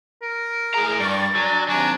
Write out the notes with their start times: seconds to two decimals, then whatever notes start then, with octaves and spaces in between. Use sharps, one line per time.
0.22 A#4
0.75 A2 G#4 A#5
1.00 G2 D5 C#6 A6
1.35 F#3 D4 G#5
1.69 D#2 C3 F#3 D4 G#5 A5